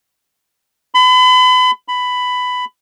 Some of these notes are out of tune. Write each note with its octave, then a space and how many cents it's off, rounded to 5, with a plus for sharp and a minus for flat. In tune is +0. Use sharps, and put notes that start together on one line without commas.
B5 +35
B5 +10